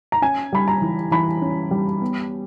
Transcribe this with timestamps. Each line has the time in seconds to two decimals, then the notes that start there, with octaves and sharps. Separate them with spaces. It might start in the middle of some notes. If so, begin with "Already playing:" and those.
0.12 A#5
0.22 C#4 G#5
0.53 G3 B5
0.68 A#5
0.82 E3
1.11 E3 B5
1.42 C#4
1.71 G3
2.02 B3